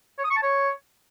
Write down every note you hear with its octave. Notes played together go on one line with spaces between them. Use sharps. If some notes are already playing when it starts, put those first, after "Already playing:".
C#5
D#6
C#6
A5
C#5